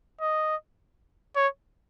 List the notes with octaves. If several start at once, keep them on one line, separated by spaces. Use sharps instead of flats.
D#5
C#5